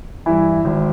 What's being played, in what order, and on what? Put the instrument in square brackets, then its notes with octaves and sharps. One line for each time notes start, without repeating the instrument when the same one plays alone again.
[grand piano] G2 E3 E4
G#1